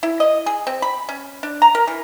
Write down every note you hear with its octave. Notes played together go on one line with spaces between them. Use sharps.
E4
D#5
G#4
C4
B5
C#4
D4
A#5
A#4
E3